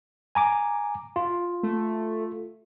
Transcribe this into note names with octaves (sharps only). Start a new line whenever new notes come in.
G#5 A#5 D6
F4
A3